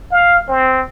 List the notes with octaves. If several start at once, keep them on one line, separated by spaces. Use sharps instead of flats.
F5
C4